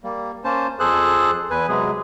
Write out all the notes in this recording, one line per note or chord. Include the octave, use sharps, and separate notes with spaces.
G3 A#3
A#3 C#4 C5 A5
F2 G#4 A4 C5 F#6
E2 B4 G#5
C3 F#3 G#3 G#4